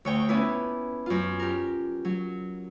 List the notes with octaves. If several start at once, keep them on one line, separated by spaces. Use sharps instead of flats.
D2 C#5 G5
B3 C#4 D4 E4 B4
F#2 F4
G4 A#4
F#3